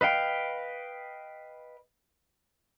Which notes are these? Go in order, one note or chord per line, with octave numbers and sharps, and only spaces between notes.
B4 D#5 F5 G5